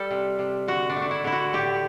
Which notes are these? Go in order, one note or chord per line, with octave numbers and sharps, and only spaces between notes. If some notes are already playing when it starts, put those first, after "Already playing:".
Already playing: G3 A4
C3
C3
D3 F#4
D4
A3
D4
E4
D3 E4
F#4
A2 G4